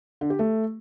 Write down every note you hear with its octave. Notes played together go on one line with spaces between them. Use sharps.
D3
G4
A3